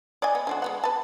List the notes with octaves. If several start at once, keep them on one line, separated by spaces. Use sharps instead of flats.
D5 D#5 G#5
B3
D3 F3 F#4
G#3 B3 F#5
B4 A5